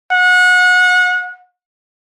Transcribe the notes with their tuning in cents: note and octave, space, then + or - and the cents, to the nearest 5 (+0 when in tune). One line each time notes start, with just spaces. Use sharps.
F#5 -30